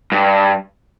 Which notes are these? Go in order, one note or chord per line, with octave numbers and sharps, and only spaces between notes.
G2